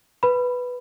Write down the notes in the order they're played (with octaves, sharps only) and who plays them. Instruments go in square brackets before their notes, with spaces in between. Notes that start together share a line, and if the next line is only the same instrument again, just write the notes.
[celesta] B4 B5